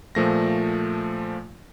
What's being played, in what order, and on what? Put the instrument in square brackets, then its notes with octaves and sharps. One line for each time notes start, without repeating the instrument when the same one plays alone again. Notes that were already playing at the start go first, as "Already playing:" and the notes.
[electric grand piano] A#2 F3 A3 A#6